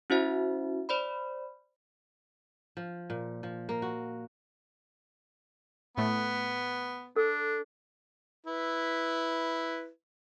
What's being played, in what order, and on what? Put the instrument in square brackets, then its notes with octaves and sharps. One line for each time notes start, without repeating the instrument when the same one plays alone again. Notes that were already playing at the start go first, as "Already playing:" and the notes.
[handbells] C#4 E4 F#4 C5 E5
C5 D5 B5
[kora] F3
A#2
F3
A#3
F#4
[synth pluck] A2 A3 [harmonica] B3
[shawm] D4 [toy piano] A4
[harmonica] E4 B4